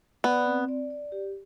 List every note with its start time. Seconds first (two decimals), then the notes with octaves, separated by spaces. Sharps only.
0.24 B3 D5
0.46 C4
0.68 D5
0.90 D5
1.12 G4